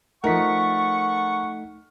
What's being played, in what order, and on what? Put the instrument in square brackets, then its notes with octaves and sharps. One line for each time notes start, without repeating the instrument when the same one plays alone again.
[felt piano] F3 A#4 [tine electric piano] A3 D#4 B6 [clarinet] F#5 [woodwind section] C#6